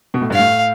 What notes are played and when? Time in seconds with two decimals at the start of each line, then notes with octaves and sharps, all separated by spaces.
0.14 B2
0.22 A2
0.30 G2
0.34 A2 F5